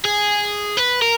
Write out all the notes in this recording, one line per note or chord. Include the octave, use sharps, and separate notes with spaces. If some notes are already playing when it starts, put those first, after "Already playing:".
G#4
B4
A#4